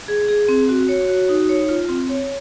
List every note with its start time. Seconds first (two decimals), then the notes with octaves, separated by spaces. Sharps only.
0.08 G#4
0.28 G#4
0.49 C4
0.69 F#4
0.89 C#5
1.09 F#4
1.29 D#4
1.49 C#5
1.69 F4
1.89 C4
2.09 C#5